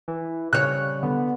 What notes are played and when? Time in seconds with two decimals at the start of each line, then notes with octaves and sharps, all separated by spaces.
0.08 E3
0.53 C#3 G3 C#5 F#6
1.03 D3 B3